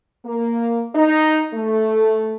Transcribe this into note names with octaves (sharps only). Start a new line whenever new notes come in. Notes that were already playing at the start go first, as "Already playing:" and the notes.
A#3
D#4
A3